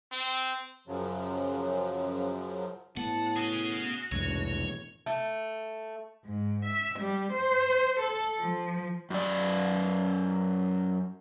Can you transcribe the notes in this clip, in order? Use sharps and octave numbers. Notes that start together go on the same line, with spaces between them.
C4
F#2 C#3 F3 F#3
A2 B3 F#5 A5
C#4 F#4 G#4
E1 C2 F2 A2 C#5
A3
G#2
E5
G3
C5
A4
F3
F#2 D5